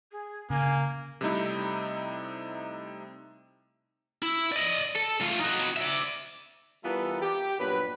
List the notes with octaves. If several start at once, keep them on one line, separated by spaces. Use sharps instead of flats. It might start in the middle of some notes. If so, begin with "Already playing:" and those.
G#4
C#3 A#3 G#5
C3 G3 A3 C4 D#4 E4
E4
D5 D#5
A4
A3 F4
D#4 F#4
D5 E5
E3 G3 B3 F4 A4 A#4
G4
G2 A#2 F#3 B3 B4